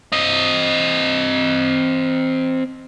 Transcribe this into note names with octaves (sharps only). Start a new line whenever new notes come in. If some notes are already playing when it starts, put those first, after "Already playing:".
C4 D#5